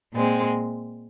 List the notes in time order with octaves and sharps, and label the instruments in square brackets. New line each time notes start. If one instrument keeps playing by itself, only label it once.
[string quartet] A#2 G#3 C4